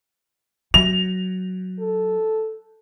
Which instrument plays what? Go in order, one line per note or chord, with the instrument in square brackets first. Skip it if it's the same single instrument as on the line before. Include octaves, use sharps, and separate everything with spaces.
[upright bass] F#3 [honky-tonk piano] F7
[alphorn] A4